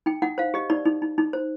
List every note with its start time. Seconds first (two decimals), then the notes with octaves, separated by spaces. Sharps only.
0.06 D#4 G5
0.22 D#4 F#5
0.38 C5 F5
0.54 G4 D#5
0.70 D#4 D5
0.85 D#4
1.02 D#4
1.18 D#4
1.33 C5